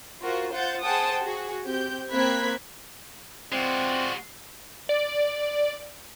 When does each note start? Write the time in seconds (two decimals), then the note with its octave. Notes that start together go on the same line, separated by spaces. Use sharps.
0.21 F4 F#4 A#4 C5
0.52 F4 C5 F#5 G6 A6
0.82 G#4 C5 F#5 G5 A5 D#6
1.20 F#4 G#4
1.65 C4 G4 G6
2.11 A#3 C4 B5 F#6 G#6 B6
3.52 G#3 C4 F4 F#4 C5 D5
4.89 D5